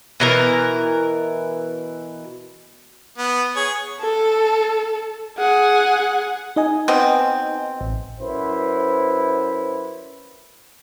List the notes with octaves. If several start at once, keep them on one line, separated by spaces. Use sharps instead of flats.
B2 E3 A#4
B3
G#4 C#5
A4
G#4 F#5
D#4 D#5 G#5
B2 C4
A1
F#2 E4 B4 C5